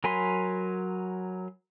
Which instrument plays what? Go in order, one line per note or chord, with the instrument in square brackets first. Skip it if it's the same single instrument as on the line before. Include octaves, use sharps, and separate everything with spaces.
[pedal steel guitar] F#3 A#4 G#5 B5 C6